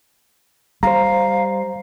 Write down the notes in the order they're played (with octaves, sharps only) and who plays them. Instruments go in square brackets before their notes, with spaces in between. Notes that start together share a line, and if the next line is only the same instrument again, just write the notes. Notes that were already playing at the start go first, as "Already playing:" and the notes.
[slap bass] G3 [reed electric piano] C5 A#5 [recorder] F5